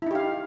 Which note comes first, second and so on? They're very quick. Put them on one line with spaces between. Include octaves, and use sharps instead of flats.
E4 D#4 G4 F5